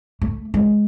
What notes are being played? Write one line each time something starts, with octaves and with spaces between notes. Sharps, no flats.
A3
G#3